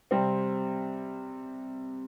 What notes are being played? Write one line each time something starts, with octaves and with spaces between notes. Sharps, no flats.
C3 G3 C4